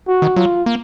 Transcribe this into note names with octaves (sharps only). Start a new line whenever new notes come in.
F#4
D#3
F#3 F4
A#3